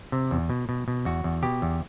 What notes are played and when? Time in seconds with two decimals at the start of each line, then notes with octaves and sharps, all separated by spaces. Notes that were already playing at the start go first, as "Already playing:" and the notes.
0.12 C3
0.31 E2
0.50 B2
0.69 B2
0.88 B2
1.05 E2 F#4
1.24 E2
1.43 B2 G4
1.62 E2